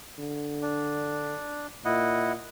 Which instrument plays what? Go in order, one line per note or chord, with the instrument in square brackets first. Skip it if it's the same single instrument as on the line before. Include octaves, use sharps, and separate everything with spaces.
[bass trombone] D3
[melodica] D4
[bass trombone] A#2 [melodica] E4 D#5 F#5